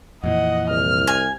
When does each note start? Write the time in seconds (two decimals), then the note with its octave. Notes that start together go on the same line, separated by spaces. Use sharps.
0.24 F2 A#2 E3 D#5 F#5
0.70 C2 F6
1.07 G#5